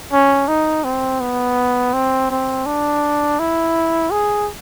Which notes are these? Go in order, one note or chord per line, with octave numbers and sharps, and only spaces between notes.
C#4
D#4
C4
B3
C4
C4
D4
E4
G#4